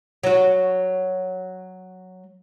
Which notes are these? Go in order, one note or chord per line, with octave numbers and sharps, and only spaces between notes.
F#3 F#4